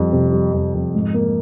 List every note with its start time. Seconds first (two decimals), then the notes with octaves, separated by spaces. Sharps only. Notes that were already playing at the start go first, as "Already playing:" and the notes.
Already playing: F2 G3
0.13 C3
0.32 G3
0.53 F2
0.74 F2
0.95 G#2
1.14 A#3